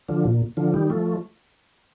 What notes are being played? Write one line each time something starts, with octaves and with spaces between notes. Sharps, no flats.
D3 F3
A#2
D3 F3
D#3 G3
F3 A3